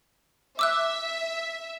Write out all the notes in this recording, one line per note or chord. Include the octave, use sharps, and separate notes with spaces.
E5 D6 E6 F#6